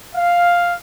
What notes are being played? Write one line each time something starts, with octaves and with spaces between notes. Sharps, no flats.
F5